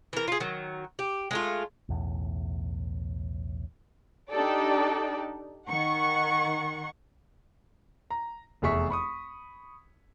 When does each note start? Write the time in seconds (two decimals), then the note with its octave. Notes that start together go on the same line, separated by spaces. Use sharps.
0.13 E3 A#4
0.28 F4 G#4
0.40 D#3 F#3
0.99 G4
1.31 G#3 A3 F4
1.89 B1 E2 A2
4.30 D4 D#4 G4 A4 D5
5.68 D#3 F#5 C#6
8.10 A#5
8.62 F1 E2 G#4 E5 C#6 B6
8.90 B5 C#6 D#6